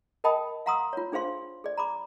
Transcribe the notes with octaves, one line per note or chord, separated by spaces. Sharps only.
A#4 D#5 G5 A5 B5 D#6
F5 F#5 A#5 C6 D#6 E6
F4 C#5
D4 G#4 C5 F5 C6
G#4 D5
A#5 B5 D6